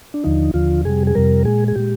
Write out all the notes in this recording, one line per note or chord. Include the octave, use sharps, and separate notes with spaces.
D4
D#2 D3 F3 D#4
D#2 D3 F3 F4
F2 C3 G3 G#4
G#4
F2 C3 G3 A#4
A#2 G#3 G#4
G#4
A#2 G#3 G4